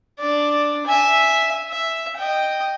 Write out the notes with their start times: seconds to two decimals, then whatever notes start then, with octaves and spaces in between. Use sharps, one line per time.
0.20 D4 D5
0.86 E5 G#5
1.69 E5
2.17 D#5 G5